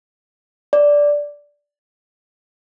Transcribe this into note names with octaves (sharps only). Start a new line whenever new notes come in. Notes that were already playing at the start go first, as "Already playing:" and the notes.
D5